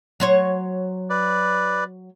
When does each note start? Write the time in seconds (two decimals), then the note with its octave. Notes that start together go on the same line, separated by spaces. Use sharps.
0.20 F#3 C5 C#5
1.10 B4 D5